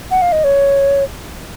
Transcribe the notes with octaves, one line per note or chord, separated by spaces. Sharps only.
F#5
F5
D#5
C#5